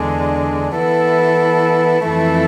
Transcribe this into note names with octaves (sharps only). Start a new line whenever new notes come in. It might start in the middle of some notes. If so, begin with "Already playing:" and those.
Already playing: E2 D3 G#3 D4
E3 B3 E4 A4
F2 E3 A3 E4 A4